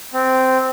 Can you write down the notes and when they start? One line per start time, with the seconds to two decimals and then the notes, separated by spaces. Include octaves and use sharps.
0.13 C4